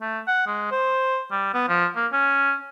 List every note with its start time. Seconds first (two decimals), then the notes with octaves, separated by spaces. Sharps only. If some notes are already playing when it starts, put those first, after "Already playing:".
0.01 A3
0.27 F#5
0.47 G#3
0.71 C5
1.31 G3
1.54 B3
1.68 F3
1.96 A#3
2.13 C#4